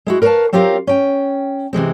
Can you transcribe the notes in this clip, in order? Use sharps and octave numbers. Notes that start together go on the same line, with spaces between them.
G#3 E4 F#4
A#4 B4 C#5 D5 F5 A5
F#3 C4 F4 G4 A#4 F5
C#4 G5
C3 E3 G#3 C4